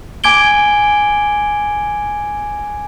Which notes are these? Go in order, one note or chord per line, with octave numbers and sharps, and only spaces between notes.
G#5 D6 G#6 D7 G7